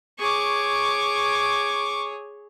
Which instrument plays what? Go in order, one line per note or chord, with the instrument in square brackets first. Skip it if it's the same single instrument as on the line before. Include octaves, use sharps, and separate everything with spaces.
[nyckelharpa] G#4 C#5 [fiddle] C#6 D6